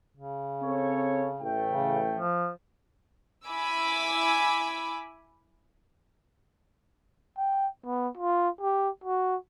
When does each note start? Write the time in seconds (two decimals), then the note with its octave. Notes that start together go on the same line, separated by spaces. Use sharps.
0.17 C#3
0.62 C4 A4 C#5
1.40 A1 A3 G5
1.69 C#3
2.16 F3
3.47 E4 G#5 B5 D6 E6
7.38 G5
7.85 B3
8.18 F4
8.61 G4
9.04 F#4